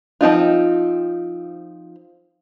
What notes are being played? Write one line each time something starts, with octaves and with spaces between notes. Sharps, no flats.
F3 C4 D#4 F4